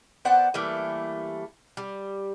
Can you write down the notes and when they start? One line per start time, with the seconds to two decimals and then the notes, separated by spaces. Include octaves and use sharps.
0.25 B3 C5 D5 F#5
0.54 E3 G3 A3 A#3
1.77 G3